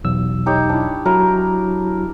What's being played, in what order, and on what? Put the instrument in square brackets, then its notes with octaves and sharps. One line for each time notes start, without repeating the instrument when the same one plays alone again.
[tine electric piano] B1 E2 E6
[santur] D#4 G4 C#5
D4 E4
[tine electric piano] F#3 E4 F#4 [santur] A#4